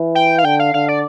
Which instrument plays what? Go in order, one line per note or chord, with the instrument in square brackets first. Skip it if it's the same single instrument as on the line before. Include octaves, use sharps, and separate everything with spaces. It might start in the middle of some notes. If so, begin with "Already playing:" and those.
Already playing: [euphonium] E3
[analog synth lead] G5
F5
[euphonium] D3 [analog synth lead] G5
[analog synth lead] F5
[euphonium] D3 [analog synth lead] F5
[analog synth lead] D5